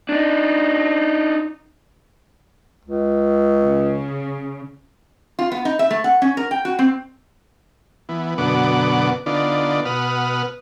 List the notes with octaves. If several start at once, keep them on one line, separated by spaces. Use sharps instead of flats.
D4 D#4
C#2
C#3
F4
B3
D#4
E5
A3
F#5
C#4
A#4
G5
F#4
C4
E3 B3
F#2 B2 D3 B3 F#5 D6
D3 B3 D#4 F4 D5
B2 B4 F#5 D#6 F6